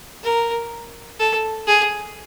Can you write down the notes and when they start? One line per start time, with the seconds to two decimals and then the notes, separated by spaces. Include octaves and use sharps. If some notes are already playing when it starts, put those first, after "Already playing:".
0.23 A#4
1.19 A4
1.67 G#4